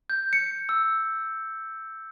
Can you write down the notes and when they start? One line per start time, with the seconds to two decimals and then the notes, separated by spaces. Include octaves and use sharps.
0.10 G6
0.33 C#7
0.69 E6